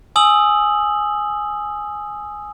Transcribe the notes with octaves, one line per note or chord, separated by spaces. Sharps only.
G#5 D#6 E6 F#7